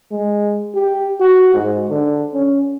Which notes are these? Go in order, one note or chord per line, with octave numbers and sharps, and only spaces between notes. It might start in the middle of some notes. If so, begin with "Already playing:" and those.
G#3
G4
F#4
G#2
D3
C#4